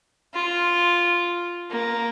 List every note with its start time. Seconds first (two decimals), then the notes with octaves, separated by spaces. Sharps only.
0.34 F4
1.70 A#3